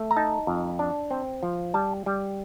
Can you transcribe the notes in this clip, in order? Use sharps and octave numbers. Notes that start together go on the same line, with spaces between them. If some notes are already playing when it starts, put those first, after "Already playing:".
Already playing: A3
A#5
D#4 A5
F2
D4
C4
F3
G3 A5
G3